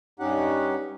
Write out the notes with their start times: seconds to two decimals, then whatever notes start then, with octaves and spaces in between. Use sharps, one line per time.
0.20 G2 C#4 D#4 G4 F#5